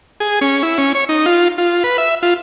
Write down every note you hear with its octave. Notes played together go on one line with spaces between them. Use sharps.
G#4
C#4
E4
C#4
C#5
D#4
F4
F4
B4
E5
F4